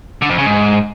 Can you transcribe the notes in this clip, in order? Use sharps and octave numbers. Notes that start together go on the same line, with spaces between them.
D3
F2
C#3
G#2